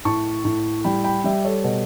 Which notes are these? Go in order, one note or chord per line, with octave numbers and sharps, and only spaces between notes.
A2 A5 C#6
A2
G3 G5 B5
G5 B5
G3 E5 G5
A4 C#5
B2